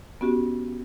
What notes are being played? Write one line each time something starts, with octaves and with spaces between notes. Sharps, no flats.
B3 C#4 F#4 G4